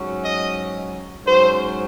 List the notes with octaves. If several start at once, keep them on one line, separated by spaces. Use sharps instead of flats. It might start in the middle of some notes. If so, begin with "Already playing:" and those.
Already playing: G#2 F#3 C#4
D#5
G#2 F#3 C#4 C5